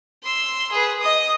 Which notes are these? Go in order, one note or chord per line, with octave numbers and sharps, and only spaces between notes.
C6 E6
G#4 B4
D#5 D#6